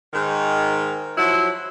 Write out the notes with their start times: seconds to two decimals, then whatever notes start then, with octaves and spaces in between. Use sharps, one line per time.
0.13 G#2 D#3
1.17 F3 F#3 E4